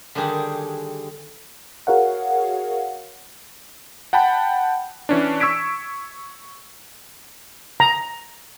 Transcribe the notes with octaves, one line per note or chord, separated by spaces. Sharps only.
D3 D#3 G3 D4 G4 G#4
F#4 G#4 A#4 C#5 F5 F#5
F#5 G5 A5 B5
E3 C#4 D4
C#6 E6 G#6 B6 D7
A#5